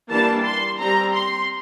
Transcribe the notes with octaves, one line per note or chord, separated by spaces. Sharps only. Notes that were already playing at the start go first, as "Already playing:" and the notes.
E3 G3 A#3 D4 A5
C6
G3 C4 A#5
C6